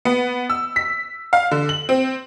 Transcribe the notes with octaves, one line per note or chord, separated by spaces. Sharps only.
B3
E6
B6
F5
D3
F#7
C4